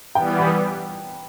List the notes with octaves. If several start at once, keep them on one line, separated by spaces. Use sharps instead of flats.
E3 G3 B3 G5
B5